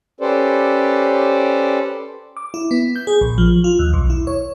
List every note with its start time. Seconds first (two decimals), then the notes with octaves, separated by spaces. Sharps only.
0.21 C#4 G4 A4 B4 C5 D5
2.37 D6
2.54 E4
2.71 B3
2.96 G6
3.07 G#4
3.21 A#1
3.38 F3
3.64 F4
3.79 D#2
3.93 B1
4.10 E4
4.27 C#5